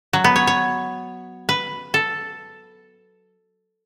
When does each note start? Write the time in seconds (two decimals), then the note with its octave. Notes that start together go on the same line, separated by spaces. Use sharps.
0.13 F#3
0.24 B3
0.36 C#5
0.47 C#5
1.49 B4
1.94 A4